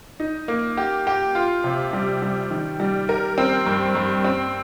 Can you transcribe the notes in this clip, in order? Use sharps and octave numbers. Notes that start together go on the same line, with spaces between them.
D#4
A#3
G4
G4
F4
C3
G3
G3
D#3
G3
A#4
C4
G2
G2
C4